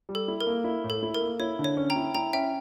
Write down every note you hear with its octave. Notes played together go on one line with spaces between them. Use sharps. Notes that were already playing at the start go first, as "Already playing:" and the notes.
G3
A4
E4
A#4
A#3
E4
A2
A4
E4
A#4
A#3
E4 C#5
D3
C#5
C#4
G5 A#5
E4
E4 G5 A#5
C#4 E5 G5